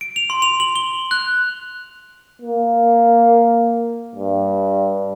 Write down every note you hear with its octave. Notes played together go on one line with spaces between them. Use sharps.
D7
F7
C6
F7
F#7
G7
F#6
A#3
G2